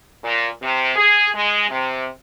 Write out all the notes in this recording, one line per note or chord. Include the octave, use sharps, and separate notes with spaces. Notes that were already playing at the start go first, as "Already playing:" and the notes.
A#2
C3
G#4
G#3
C3